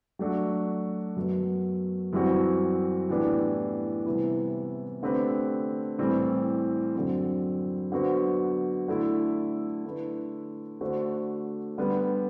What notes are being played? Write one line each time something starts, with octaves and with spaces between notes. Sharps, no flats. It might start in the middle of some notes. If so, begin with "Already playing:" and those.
F#3 A3 D4 F#4
F#2 F#3 B3
F#2 E3 G3 C4 F#4
A2 E3 B3 D4 G4
C3 E3 G3 B3 E4
D3 A3 C4 G4 B4
A2 E3 G3 C4
F#2 D3 F#3 C4
D3 F#3 B3 F#4 C5
D3 A3 E4
D3 A3 E4 B4
D3 A3 D4 F#4 C5
D3 G3 B3